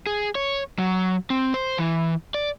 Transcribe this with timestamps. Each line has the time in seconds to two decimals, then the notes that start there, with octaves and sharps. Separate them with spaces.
0.06 G#4
0.35 C#5
0.79 F#3
1.30 C4
1.54 C5
1.78 E3
2.34 D5